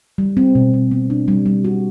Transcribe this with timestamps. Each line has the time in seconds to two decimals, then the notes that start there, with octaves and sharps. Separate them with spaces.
0.18 G3
0.37 C4
0.55 B2
0.74 B2
0.91 B3
1.10 D4
1.28 G3
1.46 G3
1.64 F#4